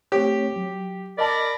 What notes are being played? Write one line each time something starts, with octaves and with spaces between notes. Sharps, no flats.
A3 C4 G4 C#5
F#3
A#4 D5 D#5 A5 B5